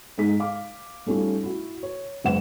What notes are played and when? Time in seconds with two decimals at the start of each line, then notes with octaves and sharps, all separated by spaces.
0.17 G#2 G#3 D#4 G#4 B6
0.40 F5 D6
1.06 G3 A3 C#4 D#4 F4
1.43 E4 F#4
1.83 C#5
2.24 F#1 G#3 B4 F#5 E7